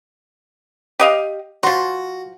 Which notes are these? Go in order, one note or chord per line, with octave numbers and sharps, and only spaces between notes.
G4 D#5 F5
F3 F#4 C6